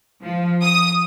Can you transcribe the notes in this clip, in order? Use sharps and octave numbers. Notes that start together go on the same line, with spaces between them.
F3
D#6